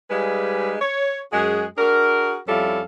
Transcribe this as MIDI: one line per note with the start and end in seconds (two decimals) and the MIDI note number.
0.10 0.76 55
0.10 0.76 56
0.10 0.76 63
0.10 0.76 68
0.10 0.76 71
0.10 0.76 77
0.81 1.19 73
1.32 1.65 42
1.32 1.65 56
1.32 1.65 66
1.32 1.65 68
1.77 2.37 62
1.77 2.37 66
1.77 2.37 68
1.77 2.37 70
2.47 2.80 41
2.47 2.80 55
2.47 2.80 61
2.47 2.80 64
2.47 2.80 69
2.47 2.80 77